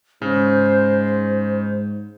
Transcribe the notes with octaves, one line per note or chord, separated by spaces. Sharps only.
G#2 C#3 C5